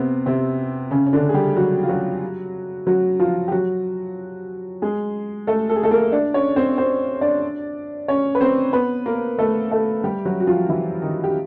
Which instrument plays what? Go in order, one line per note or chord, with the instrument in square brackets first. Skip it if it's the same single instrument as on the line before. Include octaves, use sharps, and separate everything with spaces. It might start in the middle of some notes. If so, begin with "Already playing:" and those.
Already playing: [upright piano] C3 B3 C4
C3 C4
C#3 C#4
C#4
D3 D4
G#4
G3 G4
F#3 F#4
F4
F#3 F#4
F#3 F#4
F3 F4
G4
F#3 F#4
G#3 G#4
A3 A4
A4
G#4
A3 A4
A#3 A#4
D4 D5
C#4 C#5
C4 C5
C4 C5
D4 D5
C#4 C#5
B4
C4 C5
B3 B4
A#3 A#4
A3 A4
A3 A4
G3 G4
F#3 F#4
F#4
F3 F4
E3 E4
D#3 D#4
G4